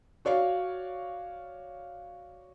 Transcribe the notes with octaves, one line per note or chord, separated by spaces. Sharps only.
F#4 C#5 D5 F5